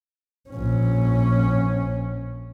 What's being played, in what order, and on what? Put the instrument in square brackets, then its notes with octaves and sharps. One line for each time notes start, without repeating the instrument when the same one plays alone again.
[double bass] A#1 C#4